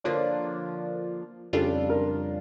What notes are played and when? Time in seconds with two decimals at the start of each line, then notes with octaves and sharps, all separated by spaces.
0.04 D3 F3 A#3 D4 F4 C#5
1.53 F2 C#3 G3 D4 F4 A4
1.89 A#4